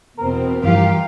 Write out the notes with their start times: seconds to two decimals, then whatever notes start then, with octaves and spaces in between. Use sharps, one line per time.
0.18 E2 B2 C4 A#4
0.64 G2 E3 F3 F4 G4 F5